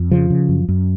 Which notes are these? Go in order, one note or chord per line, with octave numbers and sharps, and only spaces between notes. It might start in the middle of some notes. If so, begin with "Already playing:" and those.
Already playing: F2
C#3 F3
C#3
F#2
F#2